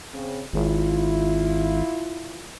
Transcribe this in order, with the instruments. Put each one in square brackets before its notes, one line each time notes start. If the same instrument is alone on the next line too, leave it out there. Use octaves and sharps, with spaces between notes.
[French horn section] C#3 C4
[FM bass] G#1 [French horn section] E4 F4